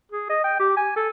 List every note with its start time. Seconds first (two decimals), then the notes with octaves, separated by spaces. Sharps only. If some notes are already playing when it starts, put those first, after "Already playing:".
0.12 G#4
0.30 D#5
0.44 G5
0.59 G4
0.77 G#5
0.96 A4